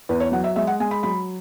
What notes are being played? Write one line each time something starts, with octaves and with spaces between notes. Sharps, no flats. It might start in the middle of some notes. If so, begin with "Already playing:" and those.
E2 B4
C#5
F#3 F#5
E5
G#3 E5
F#5
G#3 G#5
B5
F#3 B5